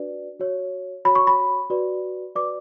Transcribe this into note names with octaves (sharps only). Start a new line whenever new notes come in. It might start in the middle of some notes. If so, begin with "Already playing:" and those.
Already playing: D4 F#4 B4 D5
F#4 C#5
F#4 C#5 B5
C#6
B5
F#4 B4 D5
F#4 B4 D5 D6